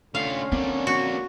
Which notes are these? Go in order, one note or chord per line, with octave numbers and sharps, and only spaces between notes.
D3 A3 C#4 F4 F5
A#3 C4 D4
F#4